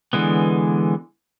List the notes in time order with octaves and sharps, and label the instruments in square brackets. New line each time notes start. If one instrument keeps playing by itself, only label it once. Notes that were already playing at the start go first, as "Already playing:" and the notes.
[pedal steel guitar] D3 E3 G#3 B3